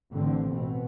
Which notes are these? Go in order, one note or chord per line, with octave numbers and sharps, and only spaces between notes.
A1 D3 C4
B2